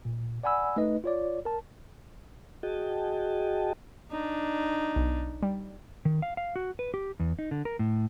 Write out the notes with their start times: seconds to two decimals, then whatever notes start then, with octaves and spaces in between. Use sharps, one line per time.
0.05 A#2
0.44 D5 F#5 G#5 B5 E6
0.76 A3 D#4 B4 D#5
1.04 F4 C#5 D5
1.45 A#4 A5
2.63 F#4 G#4 D#5 G5 A5
4.11 D4 D#4
4.96 B1
5.43 G3
6.05 D#3
6.22 F5
6.37 F5
6.56 F#4
6.79 B4
6.94 G4
7.20 E2
7.39 D#4
7.51 D3
7.65 A#4
7.79 A2